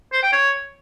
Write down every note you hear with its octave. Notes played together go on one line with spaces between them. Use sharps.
C5
G5
C#5